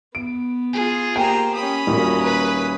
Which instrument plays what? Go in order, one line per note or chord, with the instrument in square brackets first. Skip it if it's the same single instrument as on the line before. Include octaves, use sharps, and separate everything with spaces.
[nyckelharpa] B3 [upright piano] D7
[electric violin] F4 G#4
[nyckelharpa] A#3 G4 [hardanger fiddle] C5 A#5 [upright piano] G5
[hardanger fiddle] C#4 D#6 [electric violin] B5
[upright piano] D#1 A#2 [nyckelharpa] F#4 A#4
[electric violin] B4 B5